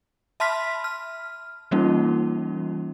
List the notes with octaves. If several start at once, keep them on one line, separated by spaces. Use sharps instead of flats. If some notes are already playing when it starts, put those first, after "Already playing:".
E5 A5 B5 C6 F6 B6
F6
E3 G3 A#3 C#4 D#4 F4